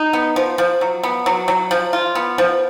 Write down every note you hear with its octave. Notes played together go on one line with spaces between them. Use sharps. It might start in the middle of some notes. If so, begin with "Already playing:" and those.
Already playing: D#4
B3
F3
F3
F#3
B3
F#3
F#3
F3
F4
B3
F3